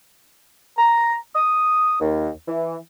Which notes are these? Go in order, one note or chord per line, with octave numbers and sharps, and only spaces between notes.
A#5
D#6
D#2
E3